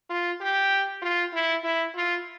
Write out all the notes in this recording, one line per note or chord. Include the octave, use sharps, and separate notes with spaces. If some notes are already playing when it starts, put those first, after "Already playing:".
F4
G4
F4
E4
E4
F4